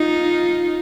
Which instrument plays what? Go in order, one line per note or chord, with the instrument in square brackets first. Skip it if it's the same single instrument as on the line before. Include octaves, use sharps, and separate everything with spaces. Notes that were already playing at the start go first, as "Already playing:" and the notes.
Already playing: [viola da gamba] D#4 F4